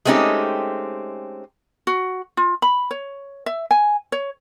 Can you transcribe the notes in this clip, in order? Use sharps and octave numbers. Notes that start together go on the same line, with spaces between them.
G#3 A3 C4 C#4 D#4 G4
F#4
F4
B5
C#5
E5
G#5
C#5